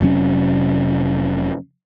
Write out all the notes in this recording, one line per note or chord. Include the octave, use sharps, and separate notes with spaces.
F1 C3 F#3 C#4